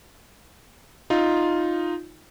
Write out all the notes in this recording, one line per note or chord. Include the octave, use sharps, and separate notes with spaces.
D#4 F4